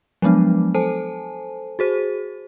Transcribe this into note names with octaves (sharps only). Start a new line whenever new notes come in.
F3 F#3 G#3 B3 D4
A4 C5 G#5 A5
F#4 G#4 C5